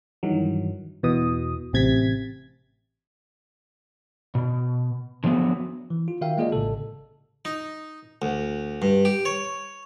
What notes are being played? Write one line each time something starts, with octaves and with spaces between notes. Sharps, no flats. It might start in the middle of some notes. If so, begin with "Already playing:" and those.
G2 D#3 E3 F#3
E2 B2 E3 D#6
A1 C3 G#6 A6 B6
B2
D3 F3 F#3 A#3 B3
E3
F4
D#3 F#4 A#4 E5 F5 G5
G#3 A#3 F4 G#4 D5 D#5
A1 A2 C#3 A4
D#4
D2
G2
G4
C#5